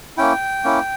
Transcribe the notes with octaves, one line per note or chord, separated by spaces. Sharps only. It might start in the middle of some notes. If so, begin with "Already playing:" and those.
A#3 C#4 E4 G5
A#3 C#4 E4